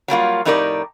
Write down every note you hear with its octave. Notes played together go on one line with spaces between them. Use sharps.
F#3 G3 A#3 F4
F2 A2 D#4 G4 A#4 D5